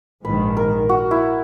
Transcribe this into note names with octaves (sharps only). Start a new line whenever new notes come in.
A#1 G#2 D#3 B4
A#4
F#4
E4